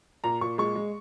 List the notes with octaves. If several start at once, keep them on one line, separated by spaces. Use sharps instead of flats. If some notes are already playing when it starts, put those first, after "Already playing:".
A#2 A#5
A#2 C#6
G#3 C#6
G#3